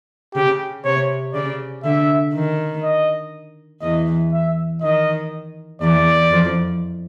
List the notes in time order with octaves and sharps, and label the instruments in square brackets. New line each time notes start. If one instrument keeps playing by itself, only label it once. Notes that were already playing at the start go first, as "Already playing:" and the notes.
[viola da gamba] C#3 [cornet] G4
[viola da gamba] C3 [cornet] C#5
[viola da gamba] C#3 [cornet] D5
[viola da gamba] D3 [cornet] E5
[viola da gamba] D#3
[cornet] D#5
[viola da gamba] E2 E3 [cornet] D#5
[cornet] E5
[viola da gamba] D#3 [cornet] D#5
[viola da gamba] E2 E3 [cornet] D5
[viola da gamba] F2 F3